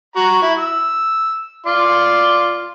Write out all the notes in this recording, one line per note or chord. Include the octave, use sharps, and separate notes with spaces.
F#4 A#5
E4
E6
F4 D5 C6